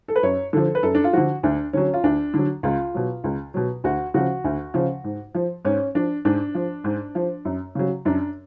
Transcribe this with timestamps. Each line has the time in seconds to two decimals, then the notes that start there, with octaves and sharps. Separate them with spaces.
0.08 A4
0.16 B4
0.23 F#2 C#5
0.53 D3 F3 A4
0.75 B4
0.83 F#2 A4
0.95 D4
1.04 F4
1.13 D3 F3 F#4
1.43 D2 D4
1.73 D3 F#3 C#4
1.94 F4
2.04 D2 D4
2.34 D3 F#3
2.63 C#2 F4
2.94 B2 F#3
3.24 C#2
3.54 B2 F#3
3.84 D2 F#4
4.14 C#3 F3 F#4
4.44 D2
4.74 C#3 F3
5.04 G#2
5.35 F3
5.65 G#2 C#4
5.95 F3 D4
6.25 G#2 D4
6.55 F3
6.84 G#2
7.15 F3
7.45 F#2
7.75 C#3 F#3
8.05 F#2 D4